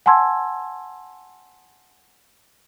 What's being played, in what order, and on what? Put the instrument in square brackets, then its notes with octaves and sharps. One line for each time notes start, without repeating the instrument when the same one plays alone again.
[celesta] F#5 G#5 A5 C6 E6 G#6